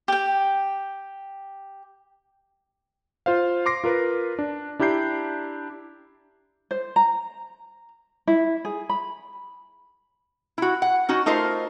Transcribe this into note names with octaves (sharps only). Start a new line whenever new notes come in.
G4 G5
F4 C5 F5
C6 D6 A#6 C7
F4 A#4 B4
D4
D4 E4 G4 A#5 G6 C7
C5
A#5
E4
G#4
B5
E4 F#4
F#5
C#4 D#4 F#4
A3 D#4 F4 A#4 C5